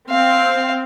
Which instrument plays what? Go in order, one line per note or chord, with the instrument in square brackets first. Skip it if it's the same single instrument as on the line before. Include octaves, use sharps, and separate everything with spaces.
[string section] C4 [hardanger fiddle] F5